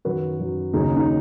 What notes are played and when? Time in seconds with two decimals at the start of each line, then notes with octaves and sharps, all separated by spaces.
0.05 F#2 D#3 F#3 F#4 B4
0.39 F#2 D#3 F#3
0.74 D#2 C#3 F#3 D#4 G#4
0.84 D#4
0.96 D#4